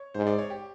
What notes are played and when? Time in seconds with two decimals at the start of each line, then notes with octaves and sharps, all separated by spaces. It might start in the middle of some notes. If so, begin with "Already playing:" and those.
Already playing: C#5
0.14 G#2 C5
0.27 D5
0.39 C#5
0.50 G4